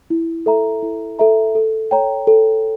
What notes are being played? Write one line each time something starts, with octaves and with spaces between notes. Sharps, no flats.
E4
A4 E5 A#5
E4
A4 E5 A#5
A4
C#5 G5 A#5
A4